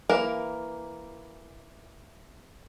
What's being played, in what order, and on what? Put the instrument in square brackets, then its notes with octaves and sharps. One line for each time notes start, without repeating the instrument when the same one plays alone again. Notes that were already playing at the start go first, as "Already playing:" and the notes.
[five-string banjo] E3 A#3 A#4